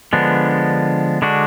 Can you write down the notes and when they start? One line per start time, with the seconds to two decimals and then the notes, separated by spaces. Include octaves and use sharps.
0.13 D3 F3 G#3 B3 D4
1.22 D3 G#3 D4 F#4